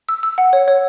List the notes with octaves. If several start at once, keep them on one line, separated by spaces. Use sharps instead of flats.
E6
E6
F#5
C#5
C#5